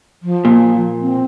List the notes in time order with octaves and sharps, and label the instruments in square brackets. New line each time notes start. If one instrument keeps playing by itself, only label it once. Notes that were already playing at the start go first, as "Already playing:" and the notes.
[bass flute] F3
[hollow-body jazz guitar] A#2
[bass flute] C4